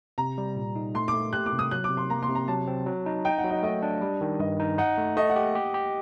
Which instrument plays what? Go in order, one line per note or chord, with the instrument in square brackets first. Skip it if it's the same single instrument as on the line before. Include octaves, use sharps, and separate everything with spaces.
[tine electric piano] C3 [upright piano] A#5
[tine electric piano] G3
A#2
D#4
[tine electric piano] A3 [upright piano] C6
[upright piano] D6
[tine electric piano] A3
[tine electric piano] G4 [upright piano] F#6
[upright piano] D6
[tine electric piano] C3
[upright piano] D#6
[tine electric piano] F#3 [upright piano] F#6
[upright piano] D6
[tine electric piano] C3
[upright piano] C6
[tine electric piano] A#3 [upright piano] A#5
[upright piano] C6
[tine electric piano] C3
[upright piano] A#5
[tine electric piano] F#3 [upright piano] A5
[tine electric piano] C4
F#3
D#4
[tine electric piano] D#4 [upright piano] G5
[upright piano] F#5
[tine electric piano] F#3
[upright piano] D#5
[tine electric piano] A3 [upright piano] D#5
[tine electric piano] D4
G3
D#3
[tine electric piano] G2 [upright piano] D#5
[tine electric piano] D#4
[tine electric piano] D#4 [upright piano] F#5
[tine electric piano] A3
[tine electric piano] A3 [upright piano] D#5
[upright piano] F#5
[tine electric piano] G4
G4
G4